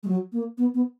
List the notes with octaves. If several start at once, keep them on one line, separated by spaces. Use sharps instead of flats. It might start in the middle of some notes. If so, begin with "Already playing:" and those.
G#3
F#3
A#3
B3
B3